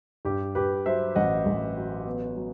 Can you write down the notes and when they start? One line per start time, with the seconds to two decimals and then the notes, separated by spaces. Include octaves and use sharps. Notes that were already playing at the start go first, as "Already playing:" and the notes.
0.25 G2 G4
0.55 G2 G4 B4
0.86 F#3 C5 E5
1.16 A1 D#5 F#5
1.46 A1
1.77 F#3
2.07 B3
2.36 F#3